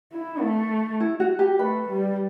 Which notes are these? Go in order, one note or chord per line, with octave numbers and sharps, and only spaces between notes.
E4
A3
E4
F#4
G4
A3 B4
G3